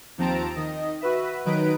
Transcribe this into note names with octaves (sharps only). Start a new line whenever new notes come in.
D#2 F3 C4 A5 A#5 D7
D#3 D#5
F#4 B4 E5
D#3 F#3 D#4 B4 D7